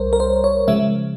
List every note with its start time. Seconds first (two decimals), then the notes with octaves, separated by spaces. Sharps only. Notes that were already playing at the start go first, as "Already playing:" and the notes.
Already playing: C2 G3 A#4 C5 C#5
0.13 A#4
0.20 C5
0.44 C#5
0.68 C#3 F3 G#3 E5